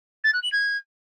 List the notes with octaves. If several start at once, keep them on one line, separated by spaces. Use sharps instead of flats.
A6
F#6
F#7
G#6